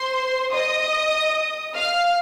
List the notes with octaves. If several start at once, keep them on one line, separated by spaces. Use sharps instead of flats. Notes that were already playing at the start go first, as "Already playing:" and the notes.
Already playing: C5 C6
D#5 D#6
F5 F6